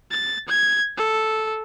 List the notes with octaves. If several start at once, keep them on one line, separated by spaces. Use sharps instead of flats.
A6
G#6
A4